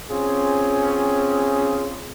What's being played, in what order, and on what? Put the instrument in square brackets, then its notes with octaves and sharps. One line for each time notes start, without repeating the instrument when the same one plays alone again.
[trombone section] C4 C#4 F4 G#4